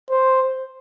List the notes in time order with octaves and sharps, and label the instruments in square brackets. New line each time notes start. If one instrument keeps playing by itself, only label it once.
[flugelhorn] C5